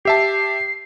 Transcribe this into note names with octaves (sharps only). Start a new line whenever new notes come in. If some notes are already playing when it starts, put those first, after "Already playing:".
G4 E5 A5 C7